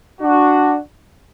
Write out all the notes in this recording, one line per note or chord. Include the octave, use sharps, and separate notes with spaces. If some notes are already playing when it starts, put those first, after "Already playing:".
D4 F#4